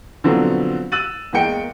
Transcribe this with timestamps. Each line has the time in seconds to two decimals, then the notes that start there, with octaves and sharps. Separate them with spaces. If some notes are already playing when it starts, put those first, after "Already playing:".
0.24 B2 D3 F3 F#3 B3 C4
0.92 E6 F#6 A6 D#7 F#7
1.33 E2 G#3 A#3 G5 C#7